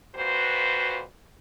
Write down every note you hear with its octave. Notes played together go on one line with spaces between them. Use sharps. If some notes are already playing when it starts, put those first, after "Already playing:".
F2 A#2 F#4 B4 C5